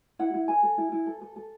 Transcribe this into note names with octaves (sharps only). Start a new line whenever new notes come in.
E4 F#5
E4
A4 G#5
A4
E4
E4
A4
A4
A4